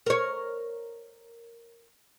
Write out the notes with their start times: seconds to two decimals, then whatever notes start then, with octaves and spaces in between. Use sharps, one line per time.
0.06 A#4 C#5